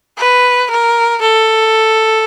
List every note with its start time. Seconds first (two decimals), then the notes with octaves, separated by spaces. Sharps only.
0.18 B4
0.71 A#4
1.22 A4